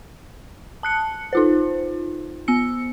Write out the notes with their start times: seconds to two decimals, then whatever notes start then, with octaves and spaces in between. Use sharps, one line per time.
0.83 A5 F#6 C#7
1.33 D#4 F4 C5
2.48 B3 E6 C#7